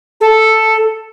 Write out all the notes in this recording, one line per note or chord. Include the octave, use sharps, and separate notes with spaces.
A4